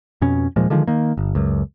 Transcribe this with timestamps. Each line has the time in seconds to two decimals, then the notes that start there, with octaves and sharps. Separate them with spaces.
0.22 F2 B2 C#4
0.56 D#1 A#2 F3 G#3
0.70 D3 D#3 F3 G#3
0.88 D#3 A#3
1.17 G1
1.35 C#2 F#2